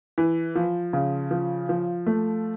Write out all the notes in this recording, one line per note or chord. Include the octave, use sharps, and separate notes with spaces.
E3
F3
C#3
F3
F3
A3